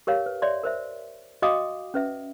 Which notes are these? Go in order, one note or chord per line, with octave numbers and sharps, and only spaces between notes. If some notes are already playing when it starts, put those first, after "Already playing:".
G4 A#4 C#5 F5
B4
C#5 D5 E5 C6
A#4 C5 E5
F#4 D#5 F5 G5 D6 D#6
C#4 B4 E5